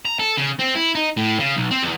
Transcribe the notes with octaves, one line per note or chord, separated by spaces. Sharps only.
A#5
A4
C#3
C4
E4
D#4
A2
C#3
B1
C4
E2